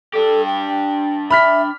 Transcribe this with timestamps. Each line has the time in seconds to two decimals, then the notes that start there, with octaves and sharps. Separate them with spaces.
0.14 D4 G4 A4
0.46 G5
1.31 E5 B5 F6 B6